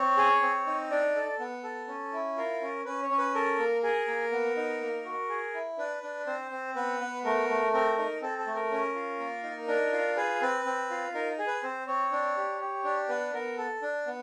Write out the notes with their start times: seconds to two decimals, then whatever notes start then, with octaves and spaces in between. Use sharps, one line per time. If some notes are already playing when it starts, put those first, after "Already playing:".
Already playing: C4 C#5
0.17 G#4
0.42 C4
0.67 D#4
0.91 D4 D5
1.16 A4
1.39 B3
1.63 A4
1.88 C#4
2.13 E4
2.37 F4 A#4
2.61 C#4
2.85 C#4 B4
3.03 C#5
3.10 C#4
3.18 B4
3.34 A4 A#4
3.59 A#3
3.83 G#4 A#4
4.08 A#3
4.32 B3
4.57 D#4
4.81 A#3
5.05 F#4
5.29 G#4
5.54 E4
5.78 D4 B4
6.03 D4
6.27 C4 C5
6.51 C4
6.76 B3 B4
7.01 B3
7.25 A3 A#4
7.49 A3
7.73 C4 A#4
7.98 D#4
8.21 C4 A4
8.38 A4
8.47 A3
8.55 A#4
8.71 C#4
8.95 F4
9.20 A#3
9.43 D#4
9.68 D4 A#4
9.92 F4
10.16 G#4 B4
10.42 C4 B4
10.65 C4
10.91 F4
11.14 D#4 A#4
11.39 G#4
11.47 B4
11.63 C4 C5
11.87 C4 C#5
12.12 D4
12.36 G4
12.61 G4
12.84 D4
13.09 B3 B4
13.34 B3 A#4
13.57 A4
13.82 D4
14.06 B3